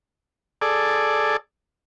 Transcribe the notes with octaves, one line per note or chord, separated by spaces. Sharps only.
G#4 A4 D5